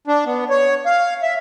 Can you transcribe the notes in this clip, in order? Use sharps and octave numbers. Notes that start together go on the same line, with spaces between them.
D4
B3
C#5
F5
E5